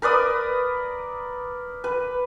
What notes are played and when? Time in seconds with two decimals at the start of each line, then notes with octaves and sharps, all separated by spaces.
0.02 A#4 B4 D5 D#6
1.84 B4